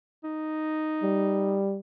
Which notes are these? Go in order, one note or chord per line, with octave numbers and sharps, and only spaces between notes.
D#4
G3